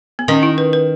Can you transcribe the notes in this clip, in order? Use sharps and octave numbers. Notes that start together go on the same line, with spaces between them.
B3
D#3 C#4
E4
B4
B4